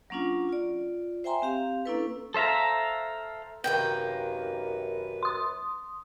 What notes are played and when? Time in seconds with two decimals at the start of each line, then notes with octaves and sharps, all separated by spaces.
0.10 F#3 A#3 C#4 D4 F4
0.49 F4 D5
1.24 C5 E5 G5 G#5 A#5 C6
1.42 C4 G4 F5
1.85 A#3 C#4 D4 E4 A4 B4
2.34 A4 C5 E5 F5 A#5
3.64 F#2 C3 D#3 A#3 B4 G5
5.23 C6 D#6